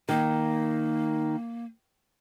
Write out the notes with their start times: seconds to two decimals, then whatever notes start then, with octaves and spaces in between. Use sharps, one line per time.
0.09 D#3 A#3